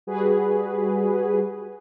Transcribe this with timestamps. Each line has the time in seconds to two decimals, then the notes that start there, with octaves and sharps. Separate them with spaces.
0.07 G3 F#4 G#4 B4